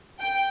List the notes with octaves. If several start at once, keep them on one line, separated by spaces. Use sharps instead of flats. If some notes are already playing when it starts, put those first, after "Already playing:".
G5